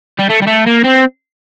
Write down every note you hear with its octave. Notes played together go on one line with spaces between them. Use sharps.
G3
A3
G3
A3
A#3
C4